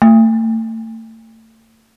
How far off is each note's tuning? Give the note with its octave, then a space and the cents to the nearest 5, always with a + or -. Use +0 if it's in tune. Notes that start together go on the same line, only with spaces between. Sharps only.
A3 +35